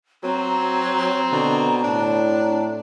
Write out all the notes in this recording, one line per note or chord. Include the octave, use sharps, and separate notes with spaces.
F#3 C4 A#5
B2 D3
A2 D4